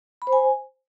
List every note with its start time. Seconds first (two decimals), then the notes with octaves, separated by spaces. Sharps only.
0.22 B5
0.27 C5
0.33 G#5